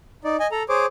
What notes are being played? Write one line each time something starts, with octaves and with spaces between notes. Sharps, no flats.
D#4 D5
D#5 G#5
A4 A#5
G#4 C5 C#5 D6